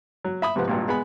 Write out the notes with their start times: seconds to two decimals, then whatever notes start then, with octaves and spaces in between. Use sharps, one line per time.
0.25 F#3
0.42 E5 B5 D#6
0.56 G#2 C3 F3 B4 F#5
0.68 G#1 G2 A#2
0.88 G#3 B3 G#5 B5